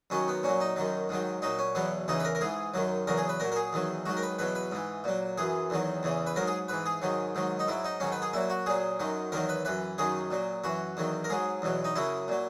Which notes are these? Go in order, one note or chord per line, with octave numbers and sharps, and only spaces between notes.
F#2 D#3 F#3 C#4
B3
A#2 F#3 C#4
D#4
F#2 D#3 F#3
G#2 D#3 F#3
A#2 F#3 D#4
C#4
E2 B2 F#3 B3
E2 C#3 E3 D#4
B4
A#4
A#4
G#2 E3 G#4
F#2 D#3 F#3
E2 C#3 F#3 A#4
G#4
B4
A#2 F#3 A#4
A#4
G#4
E2 D#3 F#3
G#2 D#3 F#3 F#4
A#4
B4
E2 B2 F#3 B4
B4
G#2 E3
A#2 F#3
F#2 E3 G#4
E2 D#3 F#3
E2 C#3 E3
B4
G#2 F#3 A#4
G#4
G#2 E3 B4
G#4
G#2 D#3 F#3
G#2 D#3 F#3
D#4
G#2 F#3 E4
D#4
G#2 D#3 F#3 C#4
B4
G#4
A#2 F#3 E4
F#4
A#2 F#3 G#4
F#2 D#3 F#3
E2 D#3 F#3 A#4
B4
F#2 E3 B4
F#2 D#3 F#3 G#4
A#2 F#3
F#2 E3 F#4
E2 D#3 F#3
A#4
G#2 F#3 G#4
E2 B2 F#3
D#4
F#2 C#3 F#3 E4
A#2 F#3